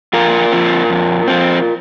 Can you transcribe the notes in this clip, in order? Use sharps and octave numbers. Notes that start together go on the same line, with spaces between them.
F2 F4 A#4
F3 C4
F2
F3 C4